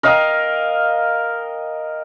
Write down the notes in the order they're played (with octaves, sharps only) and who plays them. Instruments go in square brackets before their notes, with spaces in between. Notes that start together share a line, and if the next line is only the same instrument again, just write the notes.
[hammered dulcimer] A#4 D#5 F5 G5